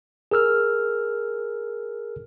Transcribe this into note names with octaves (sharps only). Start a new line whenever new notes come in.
G#4 A#4 E6 F6